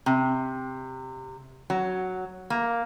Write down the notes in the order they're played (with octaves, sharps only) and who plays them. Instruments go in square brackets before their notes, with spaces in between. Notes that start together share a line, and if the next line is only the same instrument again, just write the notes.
[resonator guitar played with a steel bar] C3
F#3
A#3